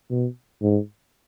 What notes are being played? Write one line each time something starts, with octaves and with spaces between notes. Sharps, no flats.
B2
G#2